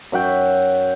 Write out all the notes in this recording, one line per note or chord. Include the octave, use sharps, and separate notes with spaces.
F#2 E5 F#5 G5